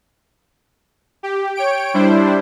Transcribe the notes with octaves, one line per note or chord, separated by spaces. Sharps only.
G4
C#5 G5 D7
G3 D4 E4 C5